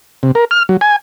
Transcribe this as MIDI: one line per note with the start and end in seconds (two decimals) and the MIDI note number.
0.23 0.32 48
0.35 0.45 70
0.51 0.63 89
0.69 0.77 54
0.81 0.96 80